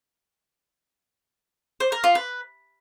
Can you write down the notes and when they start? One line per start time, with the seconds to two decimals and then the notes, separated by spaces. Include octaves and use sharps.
1.80 C5
1.92 A#4
2.04 F4
2.15 B4